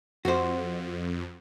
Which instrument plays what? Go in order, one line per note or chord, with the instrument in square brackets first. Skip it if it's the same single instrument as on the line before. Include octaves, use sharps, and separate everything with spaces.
[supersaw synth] F2 [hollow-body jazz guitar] F#4 C5